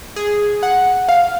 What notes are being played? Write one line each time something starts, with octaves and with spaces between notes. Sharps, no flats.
G#4
F#5
F5